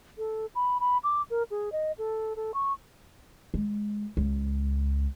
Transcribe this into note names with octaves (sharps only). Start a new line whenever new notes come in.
A4
B5
B5
D6
A#4
G#4
D#5
A4
A4
C#6
G#3
C#2